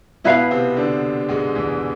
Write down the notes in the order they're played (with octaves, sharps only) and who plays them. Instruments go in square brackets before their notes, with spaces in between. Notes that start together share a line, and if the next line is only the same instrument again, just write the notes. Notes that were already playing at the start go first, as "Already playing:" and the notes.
[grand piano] B2 B3 [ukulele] E4 B4 F5
[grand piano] C3 C4
D3 D4
G#2 G#3
E2 E3